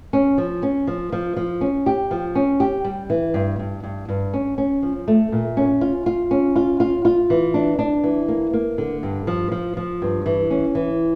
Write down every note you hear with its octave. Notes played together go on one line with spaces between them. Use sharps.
C#4
F3
C#4
F3
F3
F3
C#4
G4
F3
C#4
G4
G3
E3
G2
G2
G2
G2
C#4
C#4
F3
A3
A#2
C#4
F4
F4
C#4
F4
F4
F4
E3
D4
D4
E3
A#3
A#3
D3
G2
F3
F3
F3
G2
E3
C#4
E3